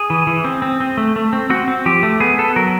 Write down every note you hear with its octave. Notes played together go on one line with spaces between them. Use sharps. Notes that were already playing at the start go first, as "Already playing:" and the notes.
Already playing: G#4
E3
E3
C4
C4
C4
A3
A3
C4
C4 F#4
C4
F3 G4
A3
B3 G#4
B3 A4
F#3 A#4